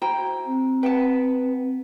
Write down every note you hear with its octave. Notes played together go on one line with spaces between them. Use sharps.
E4 F#4 C5 G5 A#5
C4
B4 F#5 G5 A5